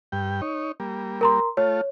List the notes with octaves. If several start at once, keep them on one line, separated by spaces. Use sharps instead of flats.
G2 G5
D#4 C#5
G3 A#3
A#4 A#5 C6
A3 F4 C#5